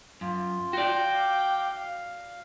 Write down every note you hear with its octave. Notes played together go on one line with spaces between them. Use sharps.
F#2 F4
F#4 D5 G5
F5 D6
F5